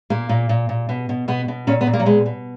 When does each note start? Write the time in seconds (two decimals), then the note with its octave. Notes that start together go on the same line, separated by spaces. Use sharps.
0.10 A#2 A#3
0.29 A#2
0.49 A#2
0.69 A#2
0.89 B2
1.09 B2
1.28 B2 B3
1.48 B2
1.67 A#2 C#4
1.81 B3
1.87 A#2
1.93 A#3
2.00 F#3
2.06 B2 G#3
2.26 B2